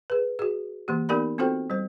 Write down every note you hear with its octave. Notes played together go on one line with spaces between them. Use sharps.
G#4 B4
F#4 G#4
E3 A#3 G4
B3 D#4 G4 A#4 D5 B5
C4 F4 F#4 A4 C5 G5
G3 C5